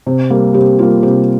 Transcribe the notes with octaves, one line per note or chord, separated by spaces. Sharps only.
C3
G3 A#3
C3 G4
G3 A#3 F4
C3 G4